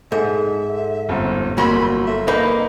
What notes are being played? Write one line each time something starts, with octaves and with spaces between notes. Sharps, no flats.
G#2 D#4 A4 E5
G1 F2
G1 F#3 A#3 A#4 B5 C6 E6
A4 E5 A#6
A#3 D#4 B4